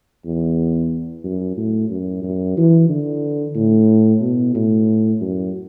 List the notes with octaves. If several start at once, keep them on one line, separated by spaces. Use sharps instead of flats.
E2
F#2
A2
F#2
F#2
E3
D3
A2
B2
A2
F#2